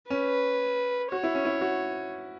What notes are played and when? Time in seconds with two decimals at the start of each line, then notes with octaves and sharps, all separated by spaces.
0.10 C#4 B4
1.12 F#4 C#5
1.24 E4
1.35 C#4
1.45 E4
1.61 F#4